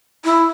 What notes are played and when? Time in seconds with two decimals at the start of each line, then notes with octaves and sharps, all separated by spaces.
0.25 E4